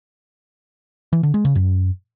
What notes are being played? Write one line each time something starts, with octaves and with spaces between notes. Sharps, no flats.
E3
D3
G#3
C#3
F#2